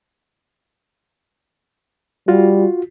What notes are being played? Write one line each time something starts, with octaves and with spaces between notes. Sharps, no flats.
G3 F4 F#4